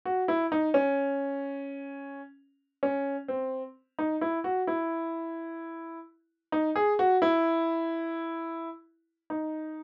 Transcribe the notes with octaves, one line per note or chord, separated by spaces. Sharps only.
F#4
E4
D#4
C#4
C#4
C4
D#4
E4
F#4
E4
D#4
G#4
F#4
E4
D#4